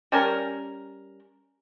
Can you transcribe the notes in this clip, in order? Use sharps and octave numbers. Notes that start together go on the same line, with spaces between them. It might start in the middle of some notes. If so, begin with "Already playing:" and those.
G3 C#4 A#4